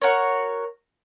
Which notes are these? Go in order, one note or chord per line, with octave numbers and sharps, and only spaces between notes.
F#4 A#4 C#5